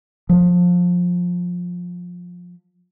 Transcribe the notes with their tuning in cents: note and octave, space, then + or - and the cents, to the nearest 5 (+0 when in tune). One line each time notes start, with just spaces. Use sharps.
F3 +20